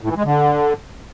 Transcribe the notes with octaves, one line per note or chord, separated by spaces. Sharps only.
A2
E3
G#3
D3